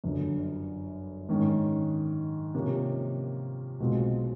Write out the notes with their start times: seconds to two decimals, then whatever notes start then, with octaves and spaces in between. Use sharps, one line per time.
0.04 G1 F#2 D3
1.29 G#2 D#3 G#3 C#4
2.54 C3 F3 A#3 C#4
3.80 B1 B2 G#3 C4 F4